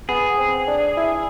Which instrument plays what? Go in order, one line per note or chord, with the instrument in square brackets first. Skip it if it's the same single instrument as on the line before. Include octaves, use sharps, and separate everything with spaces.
[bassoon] B3 [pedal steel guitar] G#4
[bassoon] C4
D4
E4